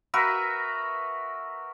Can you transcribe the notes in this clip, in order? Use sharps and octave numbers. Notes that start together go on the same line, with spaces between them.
F#4 A#4 B4 E5